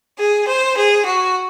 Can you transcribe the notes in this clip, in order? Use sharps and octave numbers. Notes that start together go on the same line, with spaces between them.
G#4
C5
G#4
F#4